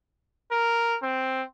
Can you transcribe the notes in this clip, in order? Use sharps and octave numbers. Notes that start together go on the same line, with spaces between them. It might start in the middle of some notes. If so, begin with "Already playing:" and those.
A#4
C4